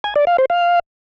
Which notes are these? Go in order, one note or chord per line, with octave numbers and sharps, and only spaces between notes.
G#5
D5
F5
C5
F5